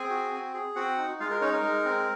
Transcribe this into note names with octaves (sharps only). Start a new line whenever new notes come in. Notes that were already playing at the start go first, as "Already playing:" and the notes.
Already playing: C4 G#4 G#5
F#4
C4
G#4
C4 F#4 F#5
D#4
G#3 F4 F5
A#4
C#4 D#4 C#5
A#4
G#3
C4